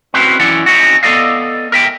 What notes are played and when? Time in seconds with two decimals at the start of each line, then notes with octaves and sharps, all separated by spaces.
0.14 C4 C#4 E4 F#4 B4 C5
0.40 F#2 E3 C#4 E4 D5 F#5
0.66 C4 C#4 D#4 F#4
1.03 B3 A4 D5 D#5 F5
1.72 A#4 E5 G5